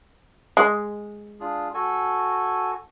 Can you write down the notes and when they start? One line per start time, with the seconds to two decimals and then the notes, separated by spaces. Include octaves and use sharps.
0.57 G#3
1.40 D4 F4 G#4
1.74 F#4 A4 G#5